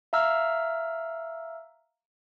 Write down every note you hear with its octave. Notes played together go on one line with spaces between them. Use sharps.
E5 F5 A#5 E6 F6